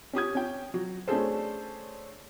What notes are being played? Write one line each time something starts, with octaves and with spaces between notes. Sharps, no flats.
C#4 G4 D#6 G#6
C#4 G5
F#3 F#4
A3 C#4 D4 G#4 A4 C5